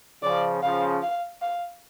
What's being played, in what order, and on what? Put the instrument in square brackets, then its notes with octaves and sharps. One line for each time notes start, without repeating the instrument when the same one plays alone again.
[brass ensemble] C#3 F3 [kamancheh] D5
[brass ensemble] C#3 F3 [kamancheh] F5
[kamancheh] F5
F5